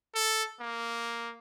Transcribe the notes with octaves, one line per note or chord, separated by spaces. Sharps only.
A4
A#3